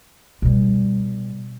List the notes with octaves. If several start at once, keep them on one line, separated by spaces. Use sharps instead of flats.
B2 G3